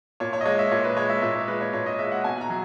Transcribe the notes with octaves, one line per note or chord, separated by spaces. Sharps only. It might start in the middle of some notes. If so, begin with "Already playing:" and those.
A#2 C#5
C#5
D#5
G#3 C#5
E5
A#2 C#5
B4
G#3 C#5
E5
A#2 E5
C#5
G#3 B4
C#5
A#2 C#5
D#5
G#3 E5
F#5
B2 G#5
A#5
F#3